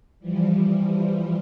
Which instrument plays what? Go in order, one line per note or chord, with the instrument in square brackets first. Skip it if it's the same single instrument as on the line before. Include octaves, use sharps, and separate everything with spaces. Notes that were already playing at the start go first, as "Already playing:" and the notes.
[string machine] E3 F3 G3